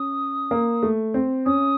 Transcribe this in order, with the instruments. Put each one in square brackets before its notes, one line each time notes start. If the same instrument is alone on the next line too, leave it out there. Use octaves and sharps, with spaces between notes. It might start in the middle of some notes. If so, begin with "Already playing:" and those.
Already playing: [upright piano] C#4 [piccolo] D#6
[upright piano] A#3
A3
C4
[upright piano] C#4 [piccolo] D#6